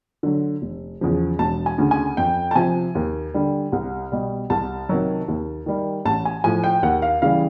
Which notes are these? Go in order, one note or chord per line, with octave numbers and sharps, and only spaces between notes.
D3 F#3
F1
E2 C#3 F3
E1 A5
G#5
D2 C#3
G#5
F2 G5
A5
C3 F3 G#5
D#2
D3 G3
C2
B2 G3
C2 A5
C3 D#3 F#3
D#2
D#3 G3
A1 A5
G#5
A2 F3 G#5
G5
D#2 F#5
F5
C#3 E3 G3 F5